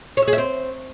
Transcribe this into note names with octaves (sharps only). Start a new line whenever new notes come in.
C#5
E5
G#4
E5
C4